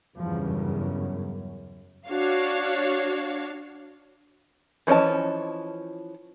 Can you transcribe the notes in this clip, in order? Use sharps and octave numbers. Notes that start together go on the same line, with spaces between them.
E2 G2 C#3 F3
F#2
D4 F#4 C#5 F5
E3 F3 C#4 D#5 A5